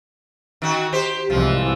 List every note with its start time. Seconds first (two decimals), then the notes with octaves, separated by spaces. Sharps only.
0.62 D#3 F#4
0.93 G4 C5
1.30 C2 G#2 E3 F3